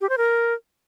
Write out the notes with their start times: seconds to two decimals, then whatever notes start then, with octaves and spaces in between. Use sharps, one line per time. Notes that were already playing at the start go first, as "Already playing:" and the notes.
0.01 G4
0.09 C5
0.18 A#4